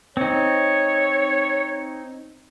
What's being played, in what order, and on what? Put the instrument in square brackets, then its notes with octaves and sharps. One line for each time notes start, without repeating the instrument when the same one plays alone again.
[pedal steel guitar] C4 D#4 [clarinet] C#5